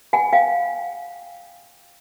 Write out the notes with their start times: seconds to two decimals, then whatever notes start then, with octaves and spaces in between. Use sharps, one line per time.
0.13 F#5 G#5
0.33 F5 G5